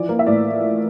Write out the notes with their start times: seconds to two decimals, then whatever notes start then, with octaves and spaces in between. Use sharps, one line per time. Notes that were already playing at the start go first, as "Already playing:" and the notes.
Already playing: E3 F3 D5
0.09 A#3
0.19 E5
0.27 A2 D5